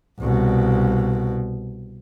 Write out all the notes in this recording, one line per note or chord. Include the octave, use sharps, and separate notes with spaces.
C2 B2